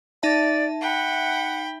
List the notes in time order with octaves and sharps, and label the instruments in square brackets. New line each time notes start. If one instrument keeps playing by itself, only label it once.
[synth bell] D#4 E5 A5 [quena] D5
[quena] F#5 [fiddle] G5 B5